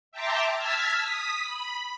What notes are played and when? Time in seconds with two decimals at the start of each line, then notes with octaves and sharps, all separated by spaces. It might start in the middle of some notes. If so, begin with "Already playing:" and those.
0.12 E5 G5 A5 A#5 C6 D6
0.55 A5 E6 F6 G#6 B6
1.02 D#6 B6
1.44 B5